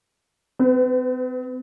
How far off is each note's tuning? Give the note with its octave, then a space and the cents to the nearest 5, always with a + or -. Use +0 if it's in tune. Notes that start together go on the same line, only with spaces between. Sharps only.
C4 -45 B4 +30